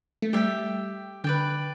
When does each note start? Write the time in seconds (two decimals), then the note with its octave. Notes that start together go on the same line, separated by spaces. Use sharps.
0.22 A3
0.33 G3 G4 E5 G5
1.24 D3 B4 D5 G5